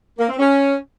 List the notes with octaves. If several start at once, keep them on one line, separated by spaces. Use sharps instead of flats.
A#3
C4
C#4